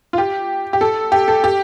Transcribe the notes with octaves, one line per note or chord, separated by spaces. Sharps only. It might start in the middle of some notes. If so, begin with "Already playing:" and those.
F4
G4
G4
A4
G4
A4
G4